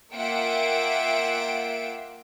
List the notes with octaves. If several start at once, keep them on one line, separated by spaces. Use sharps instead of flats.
A#3 F4 E5 F#5 G5 D7